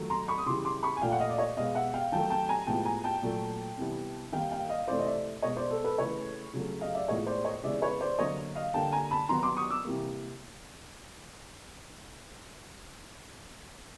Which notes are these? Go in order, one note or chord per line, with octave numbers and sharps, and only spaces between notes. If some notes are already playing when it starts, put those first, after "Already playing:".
Already playing: D#3 F#3 A3
A#5 C6
B5 C#6
D#6
C#3 E3 G3 C6 D6
C6 D6
B5 C#6
G#5
A#2 F3 A3 F5 G5
F#5
D#5 F5
D5
C#5 D#5
B2 G#3 B3 D#5 F5
E5 F#5
F5 G5
D#3 F#3 A3 G5 A5
G5 A5
G#5 A#5
A2 F3 G#3 B3 G5 A5
G#5 A#5
G5 A5
A#2 F#3 A3
C3 E3 G3 B3
D#3 G3 A#3 F5 G5
F5 G5
D#5 F5
C3 E3 A3 C5 D5
D#5
D5 E5
B2 G#3 B3 C#5 D#5
C5 D5
A4
A4 B4
C#3 E3 A3 B4 C#5
C#3 F#3 A3
D#5 F5
D5 E5
A2 F3 G#3 B3 C#5 D#5
C5 D5
C#5 D#5
C#3 E3 G#3 B3 D5 E5
B4 C#5
C5 D5
D3 F#3 A#3 C#5 D#5
D#5 F5
D3 G3 A#3 G5 A5
G#5 A#5
A5 B5
D#3 F#3 B3 A#5 C6
C6 D6
C#6 D#6
D6 E6
C3 E3 G3 A#3